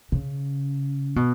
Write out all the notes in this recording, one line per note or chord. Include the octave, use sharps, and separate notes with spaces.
C#3
B2